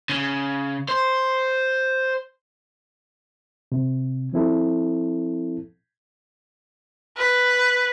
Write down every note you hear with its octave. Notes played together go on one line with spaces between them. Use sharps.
C#3
C5
C3
F3 C4 E4 A4
B4